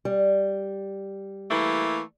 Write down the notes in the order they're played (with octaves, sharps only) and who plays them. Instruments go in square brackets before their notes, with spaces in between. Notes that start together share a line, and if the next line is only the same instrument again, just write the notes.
[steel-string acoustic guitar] G3
[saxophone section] E3 A3 A#3